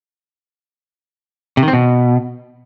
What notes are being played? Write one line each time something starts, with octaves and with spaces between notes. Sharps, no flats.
C3
D#3
C4
B2